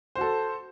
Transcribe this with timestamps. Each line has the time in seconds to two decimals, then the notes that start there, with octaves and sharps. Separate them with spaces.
0.15 C5
0.18 F#4
0.21 A4